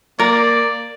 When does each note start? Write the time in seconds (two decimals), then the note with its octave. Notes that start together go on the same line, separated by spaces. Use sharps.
0.19 A#3 A#4 D5